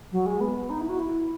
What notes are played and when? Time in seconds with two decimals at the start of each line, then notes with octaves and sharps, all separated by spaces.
0.12 F#3
0.26 G#3
0.40 B3
0.70 D#4
0.80 E4
0.89 F#4
0.99 E4